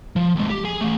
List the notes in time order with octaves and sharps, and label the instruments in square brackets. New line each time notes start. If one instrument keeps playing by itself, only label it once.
[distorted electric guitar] F3
D#2 G#3
G4
G#4 G#5
A3 C#4